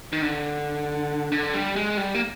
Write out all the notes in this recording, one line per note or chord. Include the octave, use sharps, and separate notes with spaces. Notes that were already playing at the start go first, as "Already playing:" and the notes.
D#3
D3
D3
G3
G#3
G3
A#3